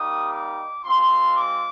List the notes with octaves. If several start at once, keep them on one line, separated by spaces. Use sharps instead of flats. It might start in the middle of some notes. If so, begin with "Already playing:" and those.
Already playing: G3 A#3 D#4 G4 D#6
D6
G#3 C4 F4 C6
D6